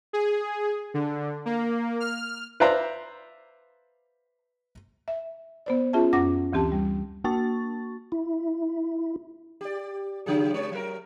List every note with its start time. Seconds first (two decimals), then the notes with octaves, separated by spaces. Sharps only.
0.13 G#4
0.94 D3
1.46 A#3
2.00 F6
2.60 B4 C5 D5 E5 F5 A#5
5.08 E5
5.66 B3 C5 D5
5.93 C#4 F4 G#4 E5 A5
6.13 F#2 C#4 F#5 D6 A#6
6.53 D2 E3 C4 G4 A5
6.72 G3
7.24 A#3 F#4 A5 C#6 A6
8.12 E4
9.61 G4 D5
10.26 C#3 F#3 G#4
10.54 G#3 C#4 C#5
10.72 F#3 A#4